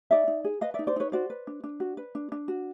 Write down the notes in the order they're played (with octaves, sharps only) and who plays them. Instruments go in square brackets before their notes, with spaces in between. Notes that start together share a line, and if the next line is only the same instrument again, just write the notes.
[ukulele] D#4 D5 E5
D#4
G#4
B4 D#5 F5
D5 E5
D#4
C5 D5
D#4 B4 C#5
F#4 C5 D5
B4
D4
D4
F#4
B4
D4
D4
F#4